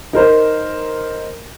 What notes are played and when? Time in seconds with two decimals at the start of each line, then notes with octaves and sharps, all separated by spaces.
0.13 D#4 A#4 C5